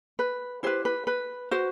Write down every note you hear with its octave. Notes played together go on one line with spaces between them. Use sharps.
B4
E4 G4 B4 C5
B4
B4
F#4 B4 C5